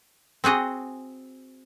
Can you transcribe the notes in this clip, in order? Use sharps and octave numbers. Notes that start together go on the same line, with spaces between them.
C4 F#4 G#4 D#5